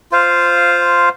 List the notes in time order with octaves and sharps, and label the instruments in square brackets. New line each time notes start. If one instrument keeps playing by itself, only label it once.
[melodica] F4 C5 F5